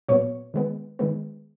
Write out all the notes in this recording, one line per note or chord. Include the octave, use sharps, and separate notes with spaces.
A#2 F#3 B3 C#5
D#3 G#3 B3
D#3 G#3 B3